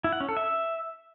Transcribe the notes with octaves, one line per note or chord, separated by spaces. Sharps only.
E4
F#5
C#4
A4
E5